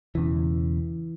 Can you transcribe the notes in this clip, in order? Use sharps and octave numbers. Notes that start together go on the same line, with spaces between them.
E1 E2 C#3 E3